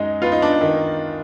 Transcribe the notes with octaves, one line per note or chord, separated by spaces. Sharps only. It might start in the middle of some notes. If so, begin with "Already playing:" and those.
Already playing: F#2 G#3 D#4
B3 F4
D#4
D4
D#4
D#3